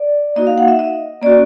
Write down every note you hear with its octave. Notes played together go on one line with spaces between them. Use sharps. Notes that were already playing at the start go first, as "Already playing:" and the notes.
Already playing: D5
A#3 D#4 F#4 D#5
F5
F#5
E5
D#5
A#3 C#4 F#4 D5